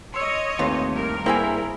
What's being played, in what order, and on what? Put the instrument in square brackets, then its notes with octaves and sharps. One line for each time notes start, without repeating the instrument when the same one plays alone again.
[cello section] C#5 D#5 [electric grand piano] C6 E6
[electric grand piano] D#2 A3 [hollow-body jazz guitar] C4 B4 [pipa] F4
[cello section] G2 A#4
[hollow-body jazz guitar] A#3 [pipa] C4 E5 G#5 [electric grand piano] E4 G#4 C5